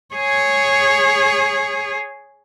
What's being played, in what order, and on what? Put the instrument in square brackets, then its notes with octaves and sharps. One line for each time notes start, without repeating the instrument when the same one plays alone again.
[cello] G#4 C#5